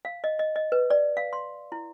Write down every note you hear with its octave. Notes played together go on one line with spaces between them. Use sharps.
F5
D#5
D#5
D#5
B4
D5
F5
C6
E4